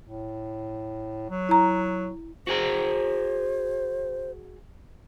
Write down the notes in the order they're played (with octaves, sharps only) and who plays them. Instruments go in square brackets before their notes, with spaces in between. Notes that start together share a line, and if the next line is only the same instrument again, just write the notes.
[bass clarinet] A2
F#3
[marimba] E4 A#5
[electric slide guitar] F#4 G#4 A#5 [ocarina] C5